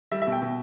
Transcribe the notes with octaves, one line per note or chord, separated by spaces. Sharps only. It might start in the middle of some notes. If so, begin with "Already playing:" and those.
G3 E5
E5
B2
G5
B2